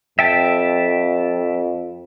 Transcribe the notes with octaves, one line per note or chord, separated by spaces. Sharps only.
F2 E5 G5 A5